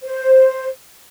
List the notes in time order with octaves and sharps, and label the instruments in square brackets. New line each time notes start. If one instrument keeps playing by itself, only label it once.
[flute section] C5